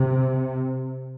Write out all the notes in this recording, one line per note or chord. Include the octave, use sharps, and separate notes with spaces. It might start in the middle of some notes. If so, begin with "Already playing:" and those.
Already playing: C3